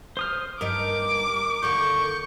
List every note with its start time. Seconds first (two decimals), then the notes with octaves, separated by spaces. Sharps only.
0.17 C5 D#6 F6
0.61 G2 B3 D#4 A#4 D6
1.62 D#2 D3 A#3 C#6 G6